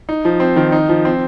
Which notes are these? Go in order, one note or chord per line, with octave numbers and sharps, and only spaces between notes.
D#4
F3
C4
D#3
D#4
F3
C4